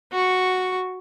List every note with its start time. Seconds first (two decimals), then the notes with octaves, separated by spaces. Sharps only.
0.12 F#4 C#6